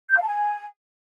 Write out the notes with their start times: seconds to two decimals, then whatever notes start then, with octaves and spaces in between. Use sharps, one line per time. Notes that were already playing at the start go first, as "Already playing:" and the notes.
0.12 G6
0.17 F5
0.22 A5
0.27 G#5